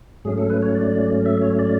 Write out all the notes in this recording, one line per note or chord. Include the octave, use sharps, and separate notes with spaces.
G#2 F#3 A3 C#4 G#4
A4
B4
C#5
D5
E5
C#5
D5